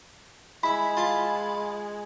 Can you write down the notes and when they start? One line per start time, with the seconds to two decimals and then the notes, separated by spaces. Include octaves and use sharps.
0.63 G#3 E4 E5 B5
0.97 F4 A5